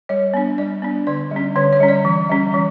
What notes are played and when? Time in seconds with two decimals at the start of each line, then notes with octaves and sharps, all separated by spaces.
0.09 G3 C#5
0.34 B3 D4
0.58 G3 D5
0.82 B3 D4
1.07 D3 D5
1.31 G3 C#4
1.56 D3 C#5
1.73 C#5
1.80 G3 C#4
1.88 D5
2.05 E3
2.29 G3 C#4
2.54 E3